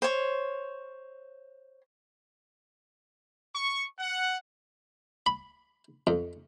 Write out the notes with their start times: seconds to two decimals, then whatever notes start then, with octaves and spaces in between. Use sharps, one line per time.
0.02 C5 C#5
3.53 C#6
3.99 F#5
5.26 B5
6.07 F2